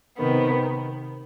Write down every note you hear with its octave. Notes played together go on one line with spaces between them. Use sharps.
C3 D#3 B3